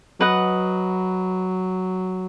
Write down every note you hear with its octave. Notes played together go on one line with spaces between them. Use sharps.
F#3 B4 D#5 F#5